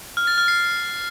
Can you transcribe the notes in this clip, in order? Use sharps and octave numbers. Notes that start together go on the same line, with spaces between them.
F6
A6
F6
C7